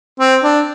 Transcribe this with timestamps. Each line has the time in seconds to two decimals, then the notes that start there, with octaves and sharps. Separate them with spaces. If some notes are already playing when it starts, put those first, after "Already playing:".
0.20 C4
0.44 D4